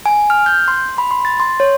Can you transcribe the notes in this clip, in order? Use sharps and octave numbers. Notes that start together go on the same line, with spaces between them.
G#5
F6
G6
C6
B5
C6
A6
C6
C#5